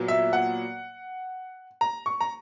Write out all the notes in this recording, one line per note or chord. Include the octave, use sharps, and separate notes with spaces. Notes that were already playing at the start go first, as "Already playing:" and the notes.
Already playing: A#2 F#3 B3
E5
F#5
A#5
C#6
A#5